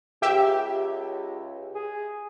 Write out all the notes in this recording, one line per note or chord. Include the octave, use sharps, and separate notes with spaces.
C#2 G4 E5
G#4